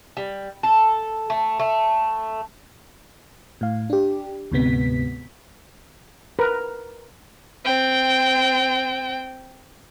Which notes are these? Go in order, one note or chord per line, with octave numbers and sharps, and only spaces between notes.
G3
A4
A3
A3
A2 F5
D4 G4
D2 G#2 C3 B3 B6
A#4 B4
C4 G5